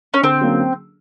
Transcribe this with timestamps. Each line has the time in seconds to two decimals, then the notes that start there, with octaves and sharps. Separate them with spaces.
0.14 C#4
0.23 D3 C4
0.41 F#3 A#3 C#4